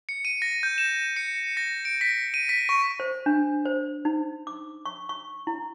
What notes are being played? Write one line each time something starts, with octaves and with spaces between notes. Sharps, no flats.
C#7
D#7
A#6
G6
E7
C#7
A#6
D7
B6
D#7
B6
C#6
C5
D4
C5
D#4
D6
C#6
C#6
E4